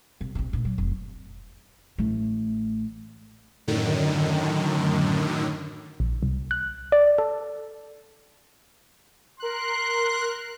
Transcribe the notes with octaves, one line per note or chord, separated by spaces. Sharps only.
C2
A#1 C3
D2 A#2
F#3
F1
A1 A3
F#2 A2 D3 D#3
A#1
C2
F#6
D5
A4
A#4 C6 F#6